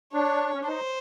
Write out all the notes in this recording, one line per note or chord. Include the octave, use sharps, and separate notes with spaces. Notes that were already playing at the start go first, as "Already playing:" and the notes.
D4 C#5
C#4
D4
D#4 C5